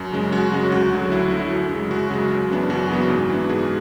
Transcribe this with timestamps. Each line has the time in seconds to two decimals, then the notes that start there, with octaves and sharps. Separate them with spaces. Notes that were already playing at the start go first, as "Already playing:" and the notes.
Already playing: F#2 F#4
0.12 C#3 G#3 C#4
0.32 F#2 F#4
0.52 C#3 G#3 C#4
0.72 D2 F#4
0.92 D3 F#3
1.12 D2 E4
1.31 D3 F#3 E4
1.51 F#2
1.71 C#3 G#3
1.91 F#2 F#4
2.10 C#3 G#3
2.31 F#2
2.50 C#3 E3 B3 D4
2.70 F#2 F#4
2.90 C#3 E3 B3 D4
3.09 G#2
3.30 E3 B3 D4
3.49 G#2 G#4